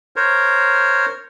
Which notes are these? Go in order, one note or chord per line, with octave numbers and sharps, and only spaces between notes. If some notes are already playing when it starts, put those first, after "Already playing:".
A#4 C5 C#5